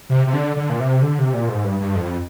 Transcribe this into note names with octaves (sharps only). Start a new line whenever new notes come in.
C3
C3
D3
D3
A#2
C3
D3
C3
A#2
G#2
G2
G2
F2